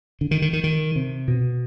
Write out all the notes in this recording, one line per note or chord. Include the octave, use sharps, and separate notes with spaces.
D3
D#3
D#3
D#3
D#3
C3
B2